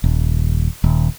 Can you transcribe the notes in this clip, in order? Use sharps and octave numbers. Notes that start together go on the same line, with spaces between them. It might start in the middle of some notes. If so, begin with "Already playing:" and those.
D#1
D#1